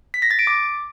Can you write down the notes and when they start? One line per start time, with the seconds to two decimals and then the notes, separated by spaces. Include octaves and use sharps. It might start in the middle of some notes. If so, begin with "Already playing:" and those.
0.14 B6
0.22 A#6
0.31 A6
0.39 D7
0.47 D6